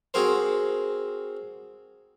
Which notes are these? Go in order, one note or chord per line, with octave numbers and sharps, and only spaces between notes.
C4 F#4 G#4 A#4 C5